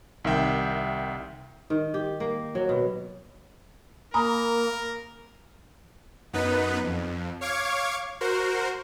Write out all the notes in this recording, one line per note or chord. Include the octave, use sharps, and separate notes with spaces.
C2 D#3 E5 G5
D#3
G4
A#3
F#3
B2
A#3 A#4 G#5 A#5 B5 D#6
F#2 B3 D#4 B4
F2
C#5 F5 C#6 D6 G#6
F#4 A#4 C5